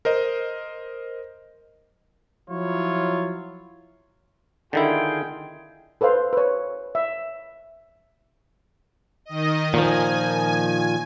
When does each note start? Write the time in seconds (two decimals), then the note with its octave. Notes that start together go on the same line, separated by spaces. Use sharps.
0.05 A#4 C5 D#5
2.50 F3 F#3 E4 F4 C#5
4.73 D3 D#3 E4 F4 G#4 G5
6.01 A4 B4 C5 F5
6.33 B4 C#5
6.95 E5
9.25 D#3 D#5
9.74 A#2 D#3 F3 G#5